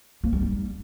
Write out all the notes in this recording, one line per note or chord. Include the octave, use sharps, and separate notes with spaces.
A#3
G3
D#4